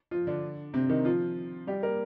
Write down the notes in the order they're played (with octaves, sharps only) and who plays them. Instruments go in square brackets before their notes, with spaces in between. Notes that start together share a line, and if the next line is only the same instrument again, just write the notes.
[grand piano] F3 F4
D3 D4
C3 C4
D#3 D#4
F3 F4
G3 G4
A#3 A#4